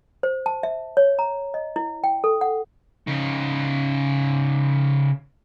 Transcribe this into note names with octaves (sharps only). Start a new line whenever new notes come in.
C5
A5
E5
C#5
A#5
D#5
E4
G5
A4
F#5
C#3 D#4